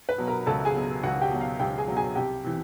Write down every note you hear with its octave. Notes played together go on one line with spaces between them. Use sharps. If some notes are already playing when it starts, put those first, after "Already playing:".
B4 B5
B2 F#3
A#4 A#5
C#2 A4 A5
G#4 G#5
B2 F#3
C#2 F#4 F#5
G4 G5
B2 F#3
F5
C#2 G4 G5
G#4 G#5
B2 F#3
G#4 G#5
C2 G4 G5
C3 E3